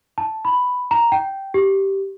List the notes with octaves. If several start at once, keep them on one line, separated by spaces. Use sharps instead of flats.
A5
B5
A#5
G5
G4